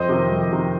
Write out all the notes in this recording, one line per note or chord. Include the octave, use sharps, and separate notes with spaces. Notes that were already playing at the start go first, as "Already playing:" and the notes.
Already playing: F2 C5 D#5
C3 D#3
F2
C3 D#3